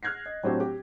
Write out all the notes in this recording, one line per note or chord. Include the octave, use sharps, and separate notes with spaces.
F6 F#6 G#6 A#6 C7
D#5
A2 F#3 C4 D4 G4
G4